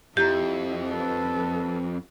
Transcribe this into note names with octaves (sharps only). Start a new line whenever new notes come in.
F2 E4 G4 A#5
A4 B4